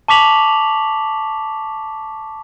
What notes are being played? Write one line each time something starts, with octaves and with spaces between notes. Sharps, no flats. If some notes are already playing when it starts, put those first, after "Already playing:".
A5 C#6 D6 B6 F7 F#7